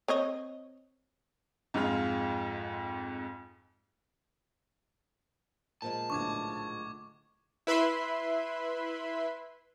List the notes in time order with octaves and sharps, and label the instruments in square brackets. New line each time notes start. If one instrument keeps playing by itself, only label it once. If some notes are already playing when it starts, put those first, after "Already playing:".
[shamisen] C4 C#5 D#5
[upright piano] F2 G#2 G#3 F4 F6
[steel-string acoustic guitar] A#2 F3 G#3 [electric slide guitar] A5
[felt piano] B1 A2 D3 [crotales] C#6 D6 G#6
[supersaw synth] E4 B4 E5 B5 C6